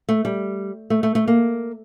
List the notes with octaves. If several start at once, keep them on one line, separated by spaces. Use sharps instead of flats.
A3
G3
A3
A3
A3
A#3